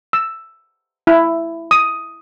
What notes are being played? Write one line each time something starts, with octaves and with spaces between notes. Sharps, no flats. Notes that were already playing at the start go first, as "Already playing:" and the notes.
E6
E4
D#6